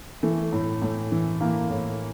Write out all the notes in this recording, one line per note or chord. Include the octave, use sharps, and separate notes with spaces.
E3 A3
A2
A2
E3
E3 A#3
A2